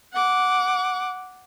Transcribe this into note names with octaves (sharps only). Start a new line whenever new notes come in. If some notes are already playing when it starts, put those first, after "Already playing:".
F#5 D6